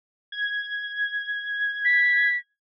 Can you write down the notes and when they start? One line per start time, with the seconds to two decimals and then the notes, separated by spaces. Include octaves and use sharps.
0.32 G#6
1.85 B6